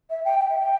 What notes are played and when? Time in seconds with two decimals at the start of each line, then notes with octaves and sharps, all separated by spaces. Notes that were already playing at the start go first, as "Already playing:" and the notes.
0.10 E5
0.25 G5
0.39 G5
0.50 E5
0.59 G5